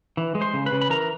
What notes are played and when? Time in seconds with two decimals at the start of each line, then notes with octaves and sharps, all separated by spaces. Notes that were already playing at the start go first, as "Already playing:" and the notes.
0.17 E3
0.35 G#3
0.41 C5 C6
0.54 C#3
0.66 B4 B5
0.72 C#3
0.81 B5
0.90 E3 A#4 A#5